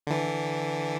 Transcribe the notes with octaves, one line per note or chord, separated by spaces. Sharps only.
D3 E3